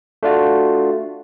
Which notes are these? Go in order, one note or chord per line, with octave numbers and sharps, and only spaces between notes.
A3 D4 F4 F#4